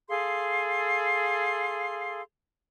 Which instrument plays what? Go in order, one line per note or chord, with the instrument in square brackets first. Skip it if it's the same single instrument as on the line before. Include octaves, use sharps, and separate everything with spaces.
[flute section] G#4 A4 F5 C6